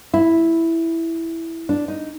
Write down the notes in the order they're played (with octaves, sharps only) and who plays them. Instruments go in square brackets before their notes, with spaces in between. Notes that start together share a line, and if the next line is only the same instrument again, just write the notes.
[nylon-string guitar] E4
D4
D#4